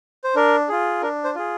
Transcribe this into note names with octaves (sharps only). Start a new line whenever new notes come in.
C5
D4 A#4
F4 G#4
D4 A#4
C5
F4 G#4